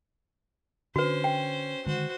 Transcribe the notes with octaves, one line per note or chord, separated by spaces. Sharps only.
D3 C#4 D4 F#4 B4 C5
G5
D3 D#3 G#3 F#4 C5